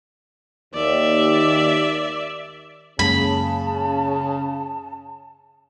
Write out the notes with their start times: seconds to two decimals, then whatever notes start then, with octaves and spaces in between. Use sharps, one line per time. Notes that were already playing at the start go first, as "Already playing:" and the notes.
0.74 D#2 D5 E5
2.99 F#2 C#3 G#3 A#3 A5 B5